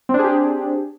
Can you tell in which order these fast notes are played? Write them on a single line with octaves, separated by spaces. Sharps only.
C4 D4 G#4 G4